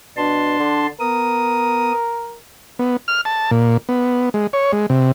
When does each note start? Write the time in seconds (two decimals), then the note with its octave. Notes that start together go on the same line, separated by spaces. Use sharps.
0.17 B2 D4 A5 C6
0.60 D3
1.00 B3 A#4 D#6
2.79 B3
3.08 F6
3.25 A5
3.51 A#2
3.89 B3
4.34 G#3
4.53 C#5
4.73 G#3
4.90 C3